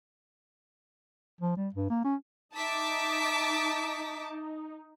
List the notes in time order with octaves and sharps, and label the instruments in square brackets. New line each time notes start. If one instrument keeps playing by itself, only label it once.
[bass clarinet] F3
G3
G2
A#3
C#4
[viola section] D#4 [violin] E5 B6 [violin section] A5 D6